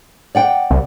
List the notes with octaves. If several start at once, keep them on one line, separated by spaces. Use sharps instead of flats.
D5 F#5 G5
C2